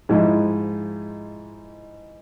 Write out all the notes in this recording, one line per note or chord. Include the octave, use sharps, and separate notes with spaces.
G#2 F3 D#4 E4